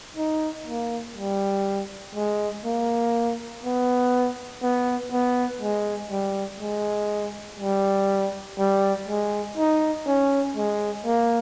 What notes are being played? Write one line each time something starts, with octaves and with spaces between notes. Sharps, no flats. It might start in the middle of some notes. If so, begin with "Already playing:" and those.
D#4
A#3
G3
G#3
A#3
B3
B3
B3
G#3
G3
G#3
G3
G3
G#3
D#4
C#4
G#3
A#3